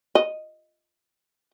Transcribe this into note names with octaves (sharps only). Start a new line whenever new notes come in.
D#5